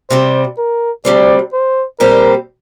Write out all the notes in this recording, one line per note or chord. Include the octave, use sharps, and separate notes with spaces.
C3 G3 C4 C5
A#4
D2 C3 G3 C4 D5
C5
A#2 G3 C4 G4 A#4 C5